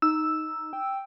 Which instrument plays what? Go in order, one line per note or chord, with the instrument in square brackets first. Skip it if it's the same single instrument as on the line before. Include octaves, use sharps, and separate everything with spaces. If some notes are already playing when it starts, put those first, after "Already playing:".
[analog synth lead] D#4 [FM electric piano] E6
[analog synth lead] G5